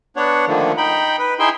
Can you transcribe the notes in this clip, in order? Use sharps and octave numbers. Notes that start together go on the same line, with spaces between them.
B3 D4 C#5 F#5
D3 D#3 F3 A3 A#3
D#4 G5 B5
B4
D#4 E4 G#4 E5 G5 C6